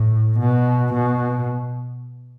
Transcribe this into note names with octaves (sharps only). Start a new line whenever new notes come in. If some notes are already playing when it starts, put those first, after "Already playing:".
Already playing: A2
B2
B2